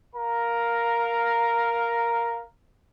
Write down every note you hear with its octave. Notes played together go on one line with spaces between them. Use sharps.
A#4 F5 A#5